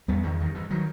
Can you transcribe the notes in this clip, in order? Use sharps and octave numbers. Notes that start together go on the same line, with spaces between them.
E2 G3 B3
E2 D#3
G2 D#3
G2 E3
D#3 F#3